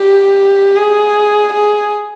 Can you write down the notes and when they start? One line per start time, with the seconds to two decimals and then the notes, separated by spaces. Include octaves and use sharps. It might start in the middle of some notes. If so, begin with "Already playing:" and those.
Already playing: G4
0.76 G#4
1.53 G#4